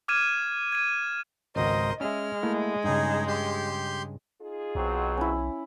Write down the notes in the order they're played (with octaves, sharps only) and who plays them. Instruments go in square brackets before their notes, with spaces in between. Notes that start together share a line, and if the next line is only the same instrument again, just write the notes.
[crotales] D6 F6 G#6 D#7 E7
G#6 D#7
[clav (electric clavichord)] G#1 C#2 F#4 [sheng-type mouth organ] A#4 C5 [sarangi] D#5
[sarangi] G#3 [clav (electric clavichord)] C#4 E5 [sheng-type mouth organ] F6
[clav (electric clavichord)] A3 A#3 E4
[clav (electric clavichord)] G2 C#3 [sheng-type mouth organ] D#4 G#4
[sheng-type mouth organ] G4 C6 G6
[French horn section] D#4 F4 G#4
[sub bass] B1 [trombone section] B2 F#3 C4
[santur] C#4 E4